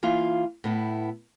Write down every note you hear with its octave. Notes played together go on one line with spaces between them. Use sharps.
E3 A#3 F4 F5
A2 B3 E4